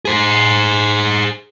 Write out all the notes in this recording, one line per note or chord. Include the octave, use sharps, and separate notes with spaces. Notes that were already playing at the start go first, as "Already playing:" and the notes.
G#4 C5